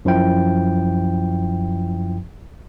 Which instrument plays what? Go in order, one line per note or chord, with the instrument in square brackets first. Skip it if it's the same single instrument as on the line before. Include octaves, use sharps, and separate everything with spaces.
[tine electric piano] F#2 F3 E4 G5